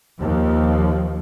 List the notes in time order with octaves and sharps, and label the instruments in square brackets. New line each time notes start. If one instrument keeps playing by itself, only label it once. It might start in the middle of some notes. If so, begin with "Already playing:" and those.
[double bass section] D#2 F3